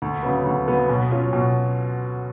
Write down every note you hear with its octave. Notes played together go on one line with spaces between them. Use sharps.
D2
C#3 F#3 B3
D2
C#3 F#3 B3
B2
F#3 C#4 F4
B2